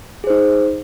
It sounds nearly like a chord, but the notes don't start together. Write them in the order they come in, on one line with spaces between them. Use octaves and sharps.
G#4 C5 D#4